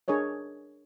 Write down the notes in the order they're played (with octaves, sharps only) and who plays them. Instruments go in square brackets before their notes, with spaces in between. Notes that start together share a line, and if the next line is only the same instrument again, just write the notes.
[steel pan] D4 G#4 A#4 C#5 D#5